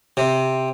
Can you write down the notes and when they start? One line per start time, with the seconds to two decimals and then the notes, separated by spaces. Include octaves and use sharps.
0.17 C3